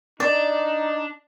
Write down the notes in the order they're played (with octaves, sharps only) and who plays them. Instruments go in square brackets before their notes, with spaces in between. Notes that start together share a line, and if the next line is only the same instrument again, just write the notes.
[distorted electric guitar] D4 [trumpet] D#4 [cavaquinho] D5